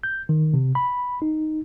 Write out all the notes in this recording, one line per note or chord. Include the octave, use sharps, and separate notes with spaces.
G6
D#3
C3
B5
D#4